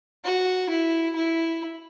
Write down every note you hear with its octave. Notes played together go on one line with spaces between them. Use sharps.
F#4
E4
E4